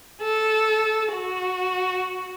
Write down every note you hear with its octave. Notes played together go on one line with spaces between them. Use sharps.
A4
F#4